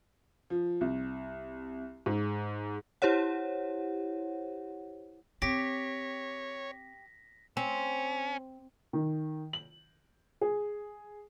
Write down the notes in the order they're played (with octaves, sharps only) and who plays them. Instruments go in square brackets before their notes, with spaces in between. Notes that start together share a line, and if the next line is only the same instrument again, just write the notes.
[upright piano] F3
C2
G#2
[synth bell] E4 G4 C5 C#5 F#5
[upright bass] C4 [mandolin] G4 [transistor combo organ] C#5 [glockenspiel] A#6 B6
[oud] C4 [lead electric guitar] C#4
[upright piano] D#3
F#7
G#4